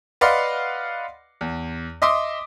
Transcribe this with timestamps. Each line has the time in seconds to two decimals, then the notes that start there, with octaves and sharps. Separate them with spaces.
0.21 B4 D5 D#5 F5 F#5 C6
1.41 E2
2.02 D#5 E5 C6 D6 D#6